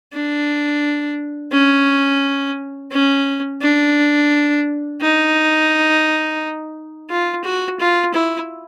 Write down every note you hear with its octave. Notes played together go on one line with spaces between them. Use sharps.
D4
C#4
C#4
D4
D#4
F4
F#4
F4
E4